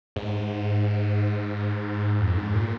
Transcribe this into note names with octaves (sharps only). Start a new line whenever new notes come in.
G#2
F2
G#2
A#2